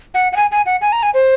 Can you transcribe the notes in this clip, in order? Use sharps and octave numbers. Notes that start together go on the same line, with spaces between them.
F#5
F#5
G#5
G#5
F#5
G#5
A#5
G#5
C5